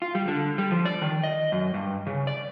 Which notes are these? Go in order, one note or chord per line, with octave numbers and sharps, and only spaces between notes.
F4
G3
D3
G3
F3
D5
D#3
D#5
F#2
G2
C#3
D5